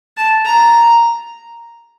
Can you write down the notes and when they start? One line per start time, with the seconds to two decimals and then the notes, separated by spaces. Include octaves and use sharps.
0.17 A5
0.45 A#5